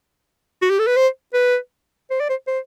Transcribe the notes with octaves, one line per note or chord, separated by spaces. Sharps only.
F#4
G4
A4
B4
C5
B4
C5
D5
C5
C5